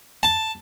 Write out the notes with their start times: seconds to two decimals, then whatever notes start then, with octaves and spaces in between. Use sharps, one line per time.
0.23 A5